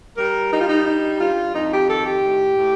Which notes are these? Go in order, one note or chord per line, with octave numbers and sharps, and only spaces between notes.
G3 A#4
G3 D#4
F4
D#4
G2 D#4
G2 F4
F2 D#4
G4
D#3 A4
G4
A2
A2